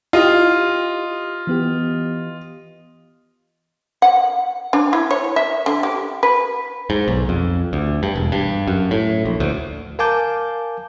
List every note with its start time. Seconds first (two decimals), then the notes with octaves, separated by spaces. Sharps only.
0.13 E4 F4 G4 D#5
1.47 E3 B3 G4
4.02 F#5
4.73 D4
4.93 E4
5.11 C#5
5.36 E5
5.66 D3
5.83 G4
6.23 B4
6.90 G#2
7.08 B1
7.29 F2
7.73 D2
8.03 G2
8.16 E1
8.32 G2
8.67 F#2
8.91 A2
9.25 A#1
9.40 D2
9.99 A#4 F5 G#5 A5 D6 G6